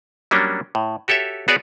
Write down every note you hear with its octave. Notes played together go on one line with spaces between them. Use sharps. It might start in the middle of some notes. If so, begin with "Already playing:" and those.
F#3 G3 A#3 C#4 D4
A2
F#4 G4 A4 C#5 E5
B3 F#4 G#4 B4 C#5 D5